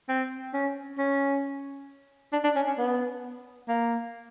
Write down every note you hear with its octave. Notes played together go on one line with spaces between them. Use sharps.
C4
C#4
C#4
D4
D4
C#4
C#4
B3
A#3